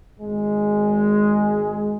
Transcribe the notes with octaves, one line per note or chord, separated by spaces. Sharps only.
G#1 G#3